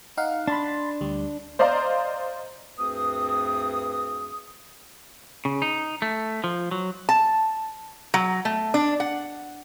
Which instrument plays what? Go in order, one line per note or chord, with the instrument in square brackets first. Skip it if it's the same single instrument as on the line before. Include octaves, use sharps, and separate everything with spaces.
[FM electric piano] D#4 F5 F#5
[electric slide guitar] D4 [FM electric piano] B5 C6 A6
[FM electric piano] D2 G3
[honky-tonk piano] C5 D5 D#5 F5 A#5 C6
[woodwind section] D2 G2 C4 G#4 B4 D#6
[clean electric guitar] C#3
D#4
A3
F3
F#3
[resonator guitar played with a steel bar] A5
F#3
A3
D4
F#5